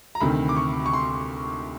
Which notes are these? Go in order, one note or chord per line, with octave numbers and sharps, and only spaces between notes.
A#5
D2 C3 D#3 B5
D6
C#6
C#6
C6